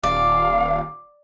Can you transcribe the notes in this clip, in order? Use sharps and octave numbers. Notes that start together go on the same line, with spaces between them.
D#1 D5 F5